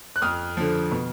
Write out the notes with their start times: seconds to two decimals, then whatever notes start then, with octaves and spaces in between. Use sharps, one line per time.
0.16 F#6
0.22 F2 D#6 F6
0.57 D3 F3
0.92 B2